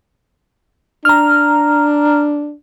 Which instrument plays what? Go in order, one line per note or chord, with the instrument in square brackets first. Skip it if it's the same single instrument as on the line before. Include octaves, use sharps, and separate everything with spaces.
[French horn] D4 [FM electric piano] A#5 F6